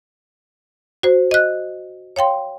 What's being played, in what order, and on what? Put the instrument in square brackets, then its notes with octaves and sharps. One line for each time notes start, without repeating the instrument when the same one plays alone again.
[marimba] F#4 C5
D#5 F#6
C#5 F5 G5 C6